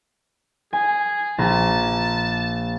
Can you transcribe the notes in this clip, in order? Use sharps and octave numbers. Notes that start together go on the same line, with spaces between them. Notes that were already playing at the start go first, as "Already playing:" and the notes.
G#4 G#5
A#1 A5 A#5